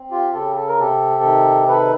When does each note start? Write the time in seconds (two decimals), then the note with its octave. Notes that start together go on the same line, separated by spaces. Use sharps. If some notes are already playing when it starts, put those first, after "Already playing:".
Already playing: C4
0.11 F4 G4
0.33 C#3 G4 A4
0.56 A4
0.68 A#4
0.79 C3 G4 A4
1.23 D#3
1.68 D#3 A4 B4